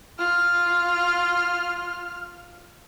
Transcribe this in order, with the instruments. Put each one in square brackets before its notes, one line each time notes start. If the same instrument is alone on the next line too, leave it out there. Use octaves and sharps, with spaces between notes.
[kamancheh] F4 F6